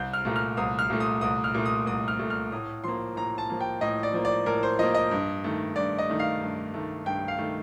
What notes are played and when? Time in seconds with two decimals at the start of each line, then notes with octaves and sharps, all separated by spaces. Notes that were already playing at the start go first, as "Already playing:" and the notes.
Already playing: C2 G6
0.14 F6
0.25 A#2 A3
0.36 F6
0.57 C2 D#6
0.79 F6
0.90 A#2 A3
1.00 D#6
1.21 C2 D#6
1.44 F6
1.54 A#2 A3
1.65 D#6
1.86 C2 D#6
2.08 F6
2.19 A#2 A3
2.30 F6
2.52 A2 D#6
2.84 F3 A#3 C6
3.16 A2 A#5
3.38 A5
3.50 F3 A#3
3.61 G5
3.81 A2 D#5
4.03 D5
4.13 F3 A#3
4.25 D5
4.46 A2 A#4
4.63 C5
4.79 F3 A#3 D#5
4.95 D#5
5.11 G2
5.44 D#3 A3
5.76 G2 D5
5.98 D#5
6.09 D#3 A3
6.20 F5
6.41 G2
6.74 D#3 A3
7.05 G2 G5
7.28 F5
7.38 D#3 A3